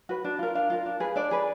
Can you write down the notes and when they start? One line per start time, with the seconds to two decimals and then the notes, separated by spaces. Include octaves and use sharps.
0.09 F#4 B4
0.24 D4
0.39 F4 A#4
0.55 D4 F5
0.70 F4 A#4
0.86 D4
1.00 G#4 B4
1.16 D4 D5
1.31 G#4 B4